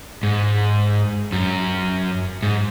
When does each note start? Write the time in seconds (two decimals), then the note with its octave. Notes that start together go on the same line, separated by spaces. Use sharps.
0.23 G#2
1.32 F#2
2.43 G#2